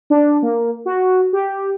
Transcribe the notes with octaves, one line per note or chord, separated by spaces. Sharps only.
D4
A#3
F#4
G4